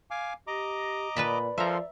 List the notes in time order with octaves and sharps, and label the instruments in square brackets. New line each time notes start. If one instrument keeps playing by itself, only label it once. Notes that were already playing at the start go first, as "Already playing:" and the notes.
[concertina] F5 G#5 D6
[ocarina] G4 [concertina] D#5 A#5 D6
[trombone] A#2 [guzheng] B4 A5 B5 [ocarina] D5
[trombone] F3 [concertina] A4 A#4 C6 [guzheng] E5 A#5